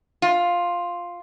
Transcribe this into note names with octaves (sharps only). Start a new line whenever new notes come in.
F4